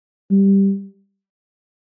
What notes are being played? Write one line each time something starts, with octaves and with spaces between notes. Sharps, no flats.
G3